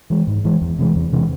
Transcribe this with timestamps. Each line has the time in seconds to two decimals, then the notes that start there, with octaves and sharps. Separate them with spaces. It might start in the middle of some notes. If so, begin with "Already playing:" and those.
0.10 E3 G#3
0.27 G#2
0.45 E3 G#3
0.62 E2
0.79 C3 E3 G#3
0.96 E2
1.13 C3 E3 G#3